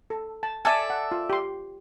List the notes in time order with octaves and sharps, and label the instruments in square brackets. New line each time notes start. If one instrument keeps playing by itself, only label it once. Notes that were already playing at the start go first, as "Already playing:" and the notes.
[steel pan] A4
A5
[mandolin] A4 D5 E5 [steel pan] G#5
[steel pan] F#5
F4
G4 C6